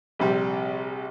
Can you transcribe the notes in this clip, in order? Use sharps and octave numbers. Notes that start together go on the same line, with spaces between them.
A#1 C3 G3